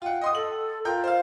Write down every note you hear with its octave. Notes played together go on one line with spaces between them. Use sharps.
F4 F#5 G5
D#5 C6 D#6
A4 F#7
F4 A#4 G5 G6
C5 F5